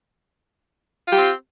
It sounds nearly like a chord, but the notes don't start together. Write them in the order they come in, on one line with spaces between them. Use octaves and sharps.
F4 G4 C4